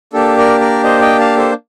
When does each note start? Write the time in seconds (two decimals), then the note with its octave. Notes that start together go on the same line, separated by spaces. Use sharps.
0.13 A#3 D4 G4 A4
0.38 A#4 D5
0.61 A#4 D5
0.84 C5 D#5
1.01 D#5 G5
1.19 F5 A5
1.36 A4 C5